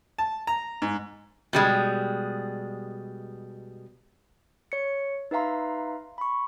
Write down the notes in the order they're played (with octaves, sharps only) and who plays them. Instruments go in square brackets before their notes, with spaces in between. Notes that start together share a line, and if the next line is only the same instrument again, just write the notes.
[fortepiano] A5
A#5
G#2
[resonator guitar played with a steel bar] B2 G3 G#3
[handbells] C#5 C#7
D#4 B4 E5 F5 A#5 C6
B5 C#6